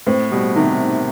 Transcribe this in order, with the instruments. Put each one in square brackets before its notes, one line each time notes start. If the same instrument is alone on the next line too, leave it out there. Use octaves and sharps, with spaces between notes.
[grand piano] A2 [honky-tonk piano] C4
[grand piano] B2 [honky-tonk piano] G3
[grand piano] C3 [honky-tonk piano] D#3